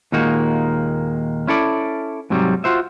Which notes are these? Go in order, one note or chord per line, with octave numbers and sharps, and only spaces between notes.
D#2 A#2 G#3 A#3 D#4 F#4
C#4 E4 A4 D5
G#2 C3 F#3 G3
F4 F#4 C5 E5